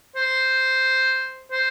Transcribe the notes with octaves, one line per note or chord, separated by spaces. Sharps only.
C5
C5